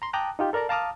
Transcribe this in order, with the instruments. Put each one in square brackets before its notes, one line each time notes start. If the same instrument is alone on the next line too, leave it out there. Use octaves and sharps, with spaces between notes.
[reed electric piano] A#5 C6
G5 A5 A#5 D6 D#6 F#6
D#4 F4 G4
A4 A#4 D5 A5 A#5
F5 A5 A#5 D6 D#6 F6